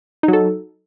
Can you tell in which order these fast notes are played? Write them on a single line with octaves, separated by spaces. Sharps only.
D#4 F#3 A4